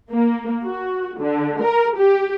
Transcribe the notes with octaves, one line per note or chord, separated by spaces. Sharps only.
A#3
F#4
D3
A#4
G4